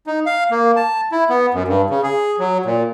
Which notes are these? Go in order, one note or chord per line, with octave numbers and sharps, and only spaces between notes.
D#4
F5
A#3
A5
E4
B3
F#2
G2
C#3
G#4
F#3
A#2